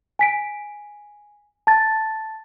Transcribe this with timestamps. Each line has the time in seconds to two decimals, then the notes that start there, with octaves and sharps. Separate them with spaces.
0.19 G#5 B6 D7
1.67 A5 A6